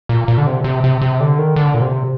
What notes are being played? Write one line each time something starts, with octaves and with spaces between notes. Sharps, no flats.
A#2
A#2
D3
C3
C3
C3
C3
D3
D#3
D3
A#2
C3